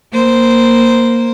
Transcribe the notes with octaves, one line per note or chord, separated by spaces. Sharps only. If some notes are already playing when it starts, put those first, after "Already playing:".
A#3 C5